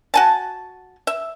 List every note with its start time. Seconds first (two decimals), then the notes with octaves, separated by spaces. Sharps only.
0.14 F#4 G#5 A5
1.07 E5